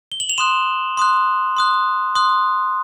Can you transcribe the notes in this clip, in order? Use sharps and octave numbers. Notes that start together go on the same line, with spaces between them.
G7
F#7
F7
C6 D#6 F#6 E7
C6 D#6 F#6
C6 D#6 F#6
C6 D#6 F#6